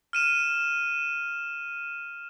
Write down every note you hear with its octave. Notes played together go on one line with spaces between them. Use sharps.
F6 D#7 E7